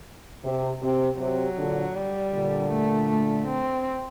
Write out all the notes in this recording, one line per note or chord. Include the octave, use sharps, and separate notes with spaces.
C3
C3
C3 F#3
A#2 D3
G3
A#2 D3
A3
A3
C4